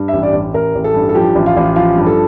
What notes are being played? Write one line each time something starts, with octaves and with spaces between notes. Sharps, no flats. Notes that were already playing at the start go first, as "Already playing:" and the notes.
Already playing: G2
A1 E5
D5
A1
A1 A#4
A1
A4
G2
A4
F3 G4
A1
F4
A1
F3 F4
G2
A4